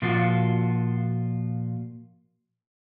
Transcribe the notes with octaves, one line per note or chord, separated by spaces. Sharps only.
A#2 F3 F4 F#4